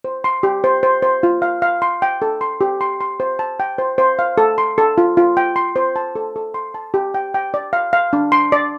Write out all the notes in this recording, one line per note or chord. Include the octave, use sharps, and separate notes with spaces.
C5
C6
G4
C5
C5
C5
F4
F5
F5
C6
G5
A4
C6
G4
C6
C6
C5
A5
G5
C5
C5
F5
A4
C6
A4
F4
F4
G5
C6
C5
A5
A4
A4
C6
A5
G4
G5
G5
D5
F5
F5
D4
C6
D5